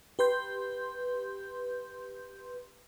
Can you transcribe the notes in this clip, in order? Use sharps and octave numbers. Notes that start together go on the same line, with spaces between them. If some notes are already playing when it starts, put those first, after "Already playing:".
G4 B4 C6 G6